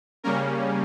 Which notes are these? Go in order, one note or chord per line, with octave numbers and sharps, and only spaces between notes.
C#3 G3 A#3 C#4 A#4